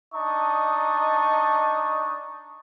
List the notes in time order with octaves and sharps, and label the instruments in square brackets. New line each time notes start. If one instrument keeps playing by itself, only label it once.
[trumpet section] D4 D#4 D#5 A5 C#6